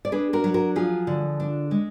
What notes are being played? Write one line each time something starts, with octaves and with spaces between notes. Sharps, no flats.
D5
D4 G#4 B4
F#4 A#4
F#3
F#4 A#4
F3 F4 G#4
D3
D4
G#3